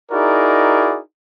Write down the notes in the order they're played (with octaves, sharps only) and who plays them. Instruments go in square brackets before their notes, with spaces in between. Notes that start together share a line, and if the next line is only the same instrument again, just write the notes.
[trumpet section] D#4 E4 F#4 G#4 A#4 D5